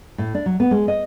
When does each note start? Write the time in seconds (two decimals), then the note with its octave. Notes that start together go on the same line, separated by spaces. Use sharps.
0.18 A2
0.35 D4
0.46 F#3
0.60 B3
0.71 G#3
0.88 D#5